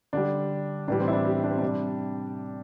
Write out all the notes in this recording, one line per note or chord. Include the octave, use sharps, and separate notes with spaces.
D3 G3 D4
A2 E3 G3 D4
C4
E4
D4
G4
D4
C4
C3 G3 D4